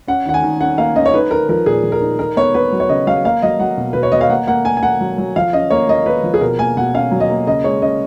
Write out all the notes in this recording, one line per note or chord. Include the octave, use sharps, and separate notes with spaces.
C#4 F#5
D#3 F#5
G#5
D#3
C#4 F#5
A#3 F5
C#4 D#5
C#5
D#4 B4
D#4 A#4
F3 A#4
A#2 G#4
F3
A#4
D#4
D#4 A#4
B3 C#5
B3 B4
F#3
C#5
C#3 D#5
F#3 F5
A#3 F5
F#3 D#5
F#3 F#5
B2
B2 B4
C#5
B2 D#5
F5
A#3 F#5
A#3 F#5
A#3 G#5
G#5
A#3 F#5
F#3
F#3
F3 F5
C#4 D#5
A#3 C#5
A#3 D#5
A#3 B4
F3
G#4
B2 A#4
A#3 G#5
B2 F#5
C#4 F5
F#3
D#5
A#3
C#3 D#5
G#3 C#5
C#4 D#5